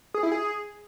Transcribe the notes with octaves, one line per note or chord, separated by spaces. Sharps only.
G#4
E4
G#4